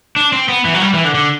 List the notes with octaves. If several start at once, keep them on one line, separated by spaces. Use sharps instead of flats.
D4
C4
B3
E3
F#3
G3
E3
D3
D3